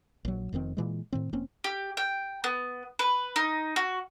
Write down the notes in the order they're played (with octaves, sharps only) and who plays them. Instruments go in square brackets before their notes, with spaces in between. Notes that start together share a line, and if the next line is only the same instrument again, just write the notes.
[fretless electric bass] A#1 F#3
F1 F2 D#3 C4
A#2 E3 G#3
A2 D#3 C4
F1 A#3 C4 C#4
[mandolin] G4
G5
B3
B4
D#4
F#4